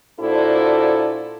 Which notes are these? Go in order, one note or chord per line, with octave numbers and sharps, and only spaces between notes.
A#2 D4 E4 F#4 A4 C5